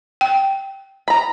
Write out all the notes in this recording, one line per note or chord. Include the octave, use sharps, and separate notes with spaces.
G5
A#5 B5